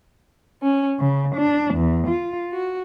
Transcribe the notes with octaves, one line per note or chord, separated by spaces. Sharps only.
C#4
C#3
D4
E2
F4
F#4